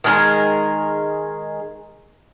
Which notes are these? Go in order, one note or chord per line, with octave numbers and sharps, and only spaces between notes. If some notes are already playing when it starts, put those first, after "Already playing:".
D#3 G#3 A#4